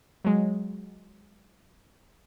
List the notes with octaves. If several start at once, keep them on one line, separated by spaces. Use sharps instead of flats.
F#3 G#3